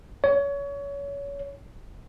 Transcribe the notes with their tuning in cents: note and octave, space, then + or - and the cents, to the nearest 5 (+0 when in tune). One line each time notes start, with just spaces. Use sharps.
C#5 +25